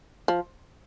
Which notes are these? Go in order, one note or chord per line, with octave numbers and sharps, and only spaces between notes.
F3